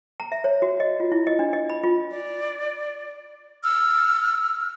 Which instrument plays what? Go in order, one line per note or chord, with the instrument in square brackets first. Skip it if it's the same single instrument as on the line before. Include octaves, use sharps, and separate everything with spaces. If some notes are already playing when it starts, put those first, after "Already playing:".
[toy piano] A#5
E5
C#5
F#4
D#5
F4
E4
D#5
D4
D#5
B5
F4
[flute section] D5
E6 F6